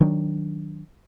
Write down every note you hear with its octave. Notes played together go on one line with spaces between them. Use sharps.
D#3 F#3 D4